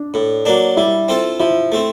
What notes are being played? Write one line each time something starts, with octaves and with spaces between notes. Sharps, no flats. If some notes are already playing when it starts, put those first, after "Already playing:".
Already playing: D4
A2
F#3 A#3 D4
G3 E4
C4 F4 A4
F3 E4
A3 C4